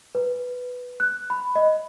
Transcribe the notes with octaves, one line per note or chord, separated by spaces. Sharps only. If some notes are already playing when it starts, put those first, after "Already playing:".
B4
F#6
B5
D#5